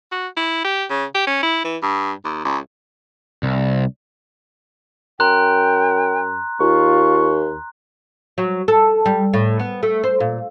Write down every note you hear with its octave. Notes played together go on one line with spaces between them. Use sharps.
F#4
E4
G4
C#3
G4
C#4
E4
E3
G2
D#2
C#2
C2
F#2 G5 A#5 C6 F#6
D#2 F4 C#6
F#3
A4
G3
A2
B3
A3
C5
A#2